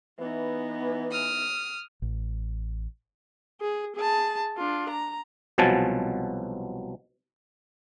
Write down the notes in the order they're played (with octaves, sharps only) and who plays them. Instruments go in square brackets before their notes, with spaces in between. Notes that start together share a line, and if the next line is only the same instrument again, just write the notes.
[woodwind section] E3 [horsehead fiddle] B3 D#4
[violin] D#6 F6
[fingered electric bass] A1
[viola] G#4
G#4 A5
D4 F4
A#5
[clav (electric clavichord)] C2 B2 F3 F#3 G#5 A5